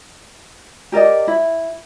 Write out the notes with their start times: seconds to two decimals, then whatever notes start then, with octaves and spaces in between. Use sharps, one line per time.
0.92 G4 A#4 D5 D#5
1.28 E4